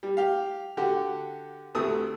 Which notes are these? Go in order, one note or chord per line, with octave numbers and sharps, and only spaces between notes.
G3
G4 F5
D3 F#4 G4
D2 C3 A3 D#6 E6